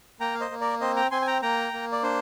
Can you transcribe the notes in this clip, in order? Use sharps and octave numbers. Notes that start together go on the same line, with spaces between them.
A#3 G5 A#5
F5
C5 D#5
A#3
A#4 D5
C4 C5 D#5
G5 A#5
C4 G#5 C6
G#5
G5 A#5
A#3 G5 A#5
A#3
D5
D4 C5